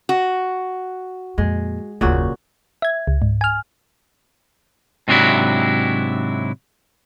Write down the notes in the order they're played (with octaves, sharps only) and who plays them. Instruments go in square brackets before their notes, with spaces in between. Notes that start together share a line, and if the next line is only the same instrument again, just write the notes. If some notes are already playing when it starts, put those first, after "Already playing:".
[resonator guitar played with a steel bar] F#4
[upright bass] F2 A#2 [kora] G#3
[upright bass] F#1 D#2 [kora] A#2 C#3 F#4
[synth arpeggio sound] E5 G#6
C#2
G#2
G#5 F6
[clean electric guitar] G#2 C3 F#3 D4 E4 F#4